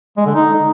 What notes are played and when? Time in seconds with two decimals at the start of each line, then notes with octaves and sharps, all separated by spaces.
0.17 G#3
0.26 D3
0.35 D#4